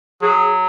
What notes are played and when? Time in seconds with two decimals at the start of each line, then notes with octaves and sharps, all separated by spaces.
0.22 F#3 G#4